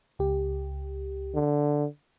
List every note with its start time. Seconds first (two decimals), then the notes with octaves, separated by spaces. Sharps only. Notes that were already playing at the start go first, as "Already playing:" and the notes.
0.19 C#2 G4
1.35 D3